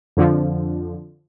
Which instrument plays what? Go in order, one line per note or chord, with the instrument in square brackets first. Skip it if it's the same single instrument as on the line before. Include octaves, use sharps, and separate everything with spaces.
[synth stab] F2 D3 F3